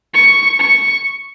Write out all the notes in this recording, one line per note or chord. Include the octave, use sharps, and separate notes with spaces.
C#6
C#6